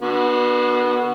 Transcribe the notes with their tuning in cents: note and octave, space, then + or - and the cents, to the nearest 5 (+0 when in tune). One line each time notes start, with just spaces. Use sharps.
D3 +30 B3 -20 F#4 +0